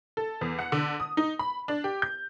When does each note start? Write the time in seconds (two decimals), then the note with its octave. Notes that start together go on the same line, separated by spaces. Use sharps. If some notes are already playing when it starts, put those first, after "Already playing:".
0.17 A4
0.41 E2
0.59 F#5
0.72 D3
1.00 D#6
1.17 D#4
1.39 B5
1.68 D4
1.84 G4
2.02 G6